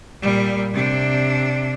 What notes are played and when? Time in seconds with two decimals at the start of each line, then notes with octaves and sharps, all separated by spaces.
0.22 A#2 G3
0.73 C3 D4